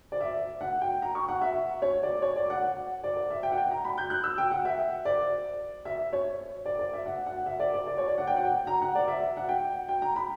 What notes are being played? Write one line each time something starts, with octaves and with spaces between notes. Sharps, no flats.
D5
E5
F#5
G5
A#5
C#6
F#5
E5
C#5
D5
C#5
D5
F#5
D5
D5
E5
G5
F#5
G5
A#5
B5
G6
F#6
E6
G5
F#5
E5
D5
E5
C#5
D5
D5
E5
F#5
F#5
E5
D5
D5
D5
C#5
D5
F#5
G5
F#5
G5
A#5
F#5
D5
E5
F#5
G5
G5
A#5
B5